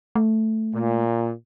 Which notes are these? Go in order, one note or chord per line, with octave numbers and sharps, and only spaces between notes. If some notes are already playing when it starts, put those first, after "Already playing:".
A3
A#2